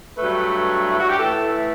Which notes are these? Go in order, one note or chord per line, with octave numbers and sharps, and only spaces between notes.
G2 F#3 A3 B4
E4
F#4
G4
A2 E3 A3 A4